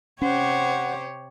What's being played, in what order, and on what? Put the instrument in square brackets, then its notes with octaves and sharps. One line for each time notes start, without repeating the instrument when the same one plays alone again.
[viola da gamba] C3 G4 C#5 [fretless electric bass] C#4 [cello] C5 [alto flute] F#5